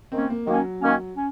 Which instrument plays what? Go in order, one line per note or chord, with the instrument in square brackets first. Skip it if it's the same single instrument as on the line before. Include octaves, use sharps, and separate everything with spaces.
[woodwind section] D#3 A#3 C#4 [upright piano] C4
[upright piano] A#3
[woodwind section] D#3 A#3 C#4 [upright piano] F#3
[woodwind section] D#3 A#3 C#4
C#4